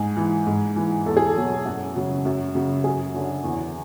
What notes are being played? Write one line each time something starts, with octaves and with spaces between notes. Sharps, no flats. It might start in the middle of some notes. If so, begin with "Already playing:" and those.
Already playing: G#2 G#4
E3
G#2
E3
E2 A4
G#4
A4
B2 F#3
F#2 F#4
C#3 F#3
F#2
C#3 F#3
F#2 G#4
D3 F#3
E2